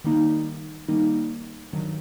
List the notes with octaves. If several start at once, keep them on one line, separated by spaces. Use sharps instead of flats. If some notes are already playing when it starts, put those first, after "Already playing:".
D#3 G3 A#3 D#4
D#3 G3 A#3 D#4
G2 D#3 F#3